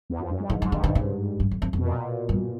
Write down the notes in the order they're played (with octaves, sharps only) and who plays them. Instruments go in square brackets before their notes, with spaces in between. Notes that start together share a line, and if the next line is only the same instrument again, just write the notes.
[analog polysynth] E2
F2
F#2
G2
[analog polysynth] G#2 [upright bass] E3
[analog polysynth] G#2 [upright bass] F3
[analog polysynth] G2 [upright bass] D#3
[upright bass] D3
C#3
G2
F2
F2
F2
[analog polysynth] B2
A#2
[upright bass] G2